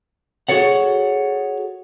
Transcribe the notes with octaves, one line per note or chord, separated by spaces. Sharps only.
F#4 G#4 A4 C#5 F#5